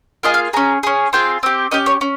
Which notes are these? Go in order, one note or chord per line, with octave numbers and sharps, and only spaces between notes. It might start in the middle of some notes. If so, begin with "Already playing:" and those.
A#3 F4 G#4 D#5
F5
C#4 G#4 A#5
C#4 G#4
C4 F4 G#4 G5
C4 G4
C#4 G4 D#5
C#5
C#4